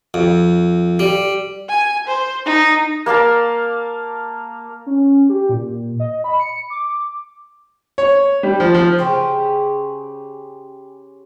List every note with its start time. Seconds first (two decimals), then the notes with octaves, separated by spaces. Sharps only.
0.14 F2
0.99 G3
1.69 G#5
2.08 C5
2.46 D#4
3.06 A#3 A#4 F5 A5
4.86 C#4
5.29 G4
5.49 A#2
6.00 D#5
6.24 B5
6.40 C#7
6.70 D6
7.98 C#5
8.43 G3
8.60 F3
8.74 F3
8.98 C#3 G4 G#4 C5